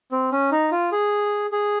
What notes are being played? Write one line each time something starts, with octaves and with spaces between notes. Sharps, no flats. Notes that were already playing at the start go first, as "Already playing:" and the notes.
C4
C#4
D#4
F4
G#4
G#4